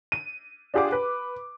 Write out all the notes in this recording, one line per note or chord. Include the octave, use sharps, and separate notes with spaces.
D#7
D4 F4 G4 G#4 F#5 D6
B4